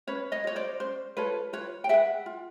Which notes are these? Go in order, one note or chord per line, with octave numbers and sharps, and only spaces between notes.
C#4 B4 C#5
C#5 D#5
F4 A4 C#5
C5 D5
C#4 C5
F4 A4 B4 C#5
F4 B4 C#5
G5
G#4 B4 E5 F#5
F4